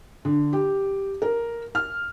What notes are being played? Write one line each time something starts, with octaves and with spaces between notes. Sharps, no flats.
D3
G4
A#4
F6